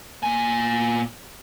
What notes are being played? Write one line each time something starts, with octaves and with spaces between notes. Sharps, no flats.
A#2 G#5